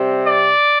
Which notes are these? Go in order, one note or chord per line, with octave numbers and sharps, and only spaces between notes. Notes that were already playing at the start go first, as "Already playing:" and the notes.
Already playing: C3 G3 C4
D5